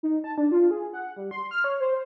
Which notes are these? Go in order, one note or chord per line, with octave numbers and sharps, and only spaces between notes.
D#4
A5
D4
F4
G#4
F#5
G3
C6
F6
C#5
C5